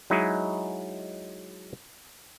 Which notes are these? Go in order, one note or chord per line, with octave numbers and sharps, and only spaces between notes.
F#3 G#3 D#4 E4 G#4